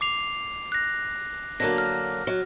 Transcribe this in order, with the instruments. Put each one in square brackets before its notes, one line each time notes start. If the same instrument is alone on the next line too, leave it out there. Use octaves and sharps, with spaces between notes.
[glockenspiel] D6 C7 F7
F#6 A#6
[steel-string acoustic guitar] D3 F#3 A#3 [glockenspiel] A#6
[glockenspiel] F6
[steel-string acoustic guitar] F#3